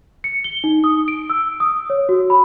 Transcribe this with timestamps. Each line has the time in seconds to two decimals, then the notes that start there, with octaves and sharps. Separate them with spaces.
0.24 C#7
0.44 G7
0.64 D#4
0.84 D#6
1.08 D7
1.30 E6
1.60 D#6
1.90 C#5
2.09 F#4
2.30 B5